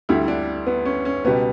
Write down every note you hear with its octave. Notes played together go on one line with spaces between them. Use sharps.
D2 D3 G3 E4
D4
B3
C#4
C#4
C#2 B2 G3 B3